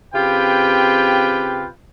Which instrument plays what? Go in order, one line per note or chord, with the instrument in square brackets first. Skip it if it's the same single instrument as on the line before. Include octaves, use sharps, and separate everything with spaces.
[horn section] C#3 C4 F4 G4 B4 G5